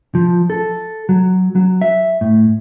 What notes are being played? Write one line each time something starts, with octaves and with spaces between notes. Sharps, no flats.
F3
A4
F#3
F#3
E5
A2